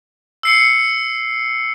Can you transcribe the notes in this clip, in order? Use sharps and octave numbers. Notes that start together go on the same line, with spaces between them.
E6 C7 C#7